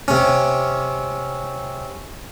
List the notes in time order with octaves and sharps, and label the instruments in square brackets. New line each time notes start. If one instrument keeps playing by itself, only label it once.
[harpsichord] C3 C#4